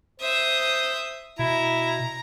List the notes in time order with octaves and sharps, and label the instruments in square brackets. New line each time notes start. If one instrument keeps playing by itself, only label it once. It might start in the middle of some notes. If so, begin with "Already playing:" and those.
[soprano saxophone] C5 [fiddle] E5 D#6
[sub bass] B2 [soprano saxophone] E4 [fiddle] A#5